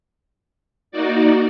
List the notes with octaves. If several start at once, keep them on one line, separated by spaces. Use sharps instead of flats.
A#3 D#4 F#4 D5